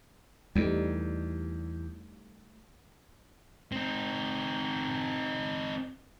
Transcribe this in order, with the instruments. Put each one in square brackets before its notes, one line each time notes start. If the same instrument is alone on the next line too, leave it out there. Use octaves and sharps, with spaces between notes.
[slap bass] E2 [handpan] G3 A3 D#4
[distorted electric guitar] C4 D#4